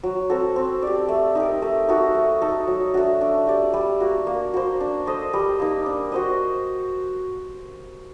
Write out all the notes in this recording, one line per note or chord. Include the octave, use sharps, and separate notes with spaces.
F#3
C4 F#4 A4
C4
G4 D5
A3
D#4 G4 A#4
A3
D#4 F#4 A4
A3
D#4 A4
F#3
A3 D4 F#4
D4
G4 D5
G3
A#3 F#4
A#3
F#4 C5
D4
A4 C5 D#5
G3
A#3 D#4
D4
F#4 C5 D#5